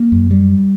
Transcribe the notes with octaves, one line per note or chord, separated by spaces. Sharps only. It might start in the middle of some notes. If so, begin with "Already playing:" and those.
Already playing: A#3
F#2
G3